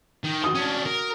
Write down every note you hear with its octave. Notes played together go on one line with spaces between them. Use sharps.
D#3
F#4 D#6 G7
C#4 D4
A#4